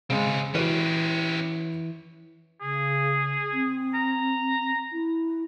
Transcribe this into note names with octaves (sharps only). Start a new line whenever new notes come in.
C#3 G#3 C4 G#4
E3 C#4 F#4 G4 B4
C#3 G#4
C4
A#5
E4